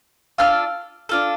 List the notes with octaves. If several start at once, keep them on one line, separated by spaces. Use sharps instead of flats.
D4 F4 A4 F6
D4 F4 A4